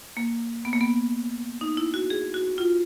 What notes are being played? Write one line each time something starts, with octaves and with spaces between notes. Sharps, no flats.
A#3
B3
A#3
B3
D#4
E4
F#4
G#4
F#4
F4